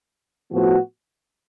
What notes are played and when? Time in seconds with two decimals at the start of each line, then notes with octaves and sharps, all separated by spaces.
0.52 A2 F3 B3 F#4